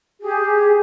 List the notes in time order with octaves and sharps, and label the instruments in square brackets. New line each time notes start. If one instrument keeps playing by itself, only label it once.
[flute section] G4 G#4